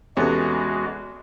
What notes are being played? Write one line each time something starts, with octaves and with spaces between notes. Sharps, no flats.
E2 C3 G#3 B3 C#4 F#4 A4